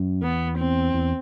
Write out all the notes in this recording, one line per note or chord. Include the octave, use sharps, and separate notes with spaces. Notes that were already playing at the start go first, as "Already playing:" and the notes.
Already playing: F#2
E2 B3
C4
E2